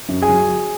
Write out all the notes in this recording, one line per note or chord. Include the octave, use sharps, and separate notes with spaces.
F#2
G#4 G#5
F#3